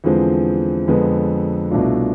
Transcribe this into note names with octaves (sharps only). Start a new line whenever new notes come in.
E2 D3 F3 G#3 C4
F2 D3 G#3 B3
C2 B2 A3 D4 F4